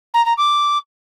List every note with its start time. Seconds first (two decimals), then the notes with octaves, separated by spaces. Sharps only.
0.14 A#5
0.26 A#5
0.37 D6